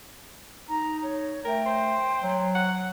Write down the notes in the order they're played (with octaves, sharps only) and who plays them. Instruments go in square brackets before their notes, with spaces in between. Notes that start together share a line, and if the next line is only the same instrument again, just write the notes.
[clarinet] D#4 [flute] A#5
[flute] C#5
[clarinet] A3 [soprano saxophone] A#4 [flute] G5
[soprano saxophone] C5
[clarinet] F#3
[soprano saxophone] F#5